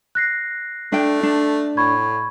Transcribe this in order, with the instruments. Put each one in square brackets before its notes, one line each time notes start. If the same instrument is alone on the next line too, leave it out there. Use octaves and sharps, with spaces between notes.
[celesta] F#6 A#6 C7
[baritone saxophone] A3 [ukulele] D4 G5
[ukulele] D4
[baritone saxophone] A2 [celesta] B5 C#6 G#6